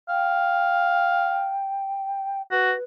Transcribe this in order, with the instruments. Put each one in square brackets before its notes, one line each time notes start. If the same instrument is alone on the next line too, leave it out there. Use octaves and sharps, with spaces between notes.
[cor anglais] F5 [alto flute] G5
[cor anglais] F#4 [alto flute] B4